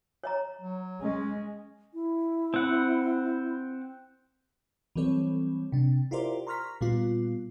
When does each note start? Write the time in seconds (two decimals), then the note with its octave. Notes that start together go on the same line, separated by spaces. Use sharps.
0.24 C#5 D#5 A#5
0.61 F#3
1.03 G#3 C#4
1.94 E4
2.54 C4 F#5
4.96 E3 F#3 G3 C4 A4 C#5
5.72 C3 D4
6.11 E4 F4 G4 A#4 C5 D5
6.47 A#5 C6 C#6 F6 A#6 B6
6.81 A#2 G3 B3 F4